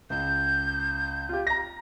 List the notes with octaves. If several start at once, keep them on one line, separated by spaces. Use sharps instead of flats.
C#2 G6
F4 G4
A#5 A#6